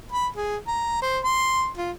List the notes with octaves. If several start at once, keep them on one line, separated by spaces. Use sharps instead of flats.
B5
G#4
A#5
C5
C6
F4